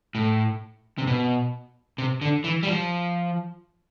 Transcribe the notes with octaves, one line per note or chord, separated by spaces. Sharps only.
A2
C3
B2
C3
D3
E3
G3
F3